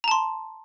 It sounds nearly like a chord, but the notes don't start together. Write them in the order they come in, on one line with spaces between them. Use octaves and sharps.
A#5 A5 C6